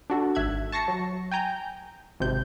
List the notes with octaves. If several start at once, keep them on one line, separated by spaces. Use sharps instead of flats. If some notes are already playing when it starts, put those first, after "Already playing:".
D4 F#4 A4
G#1 E5 F#6 G#6
A5 C#6 A#6 C7 C#7
F#3
G5 G#5 A#5 G6
G#1 C3 G6